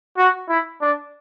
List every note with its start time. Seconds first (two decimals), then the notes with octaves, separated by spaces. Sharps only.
0.18 F#4
0.49 E4
0.81 D4